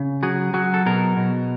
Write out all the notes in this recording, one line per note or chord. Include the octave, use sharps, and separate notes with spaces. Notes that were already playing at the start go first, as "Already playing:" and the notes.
Already playing: C#3
F#3 F#4 G#4
F#3 F#4 G#4
A4
B2 G#4 A#4
B2